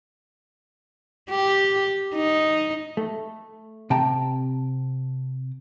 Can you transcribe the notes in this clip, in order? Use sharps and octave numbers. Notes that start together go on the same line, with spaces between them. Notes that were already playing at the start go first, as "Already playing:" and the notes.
G4
D#4
A3
C3 G5 A5 A#5